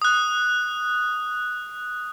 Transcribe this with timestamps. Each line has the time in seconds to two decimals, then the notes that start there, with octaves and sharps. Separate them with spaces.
0.02 D#6 F#6